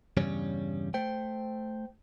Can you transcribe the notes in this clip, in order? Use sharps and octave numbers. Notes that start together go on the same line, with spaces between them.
E2 G2 C#3 G3 C#4 C#5
A3 C5 G5